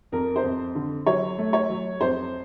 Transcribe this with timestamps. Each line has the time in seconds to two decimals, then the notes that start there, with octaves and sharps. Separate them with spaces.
0.12 F2 A#4
0.36 C5
0.44 F2
0.75 D3
1.06 F#3 C#5
1.38 A3
1.53 C#5
1.70 F#3
2.01 F2 C5